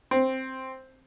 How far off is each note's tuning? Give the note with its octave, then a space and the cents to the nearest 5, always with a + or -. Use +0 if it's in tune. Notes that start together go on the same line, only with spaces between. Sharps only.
C4 +5